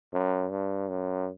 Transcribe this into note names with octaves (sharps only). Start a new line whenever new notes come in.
F#2
G2
F#2